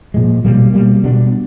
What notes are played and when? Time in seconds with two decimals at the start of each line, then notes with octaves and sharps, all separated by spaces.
0.14 A#2 F3 G#3
0.45 B2 G3 A#3
0.74 B2 G3 A#3
1.04 B2 G3 B3 D4